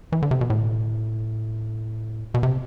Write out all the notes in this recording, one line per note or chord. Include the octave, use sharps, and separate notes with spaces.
E3
D3
C3
B2
A2
B2
C3